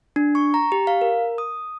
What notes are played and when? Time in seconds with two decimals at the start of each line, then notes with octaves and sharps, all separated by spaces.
0.16 D4
0.35 C#6
0.54 A#5
0.72 G4
0.87 F5
1.01 A#4
1.38 D#6